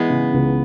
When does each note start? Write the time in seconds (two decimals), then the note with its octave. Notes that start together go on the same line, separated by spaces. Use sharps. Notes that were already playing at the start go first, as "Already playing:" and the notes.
Already playing: E3 G#3 B3
0.10 C#3
0.33 C#2